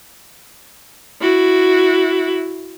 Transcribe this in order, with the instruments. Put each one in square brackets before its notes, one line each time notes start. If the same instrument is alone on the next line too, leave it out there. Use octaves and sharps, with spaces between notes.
[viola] E4 F#4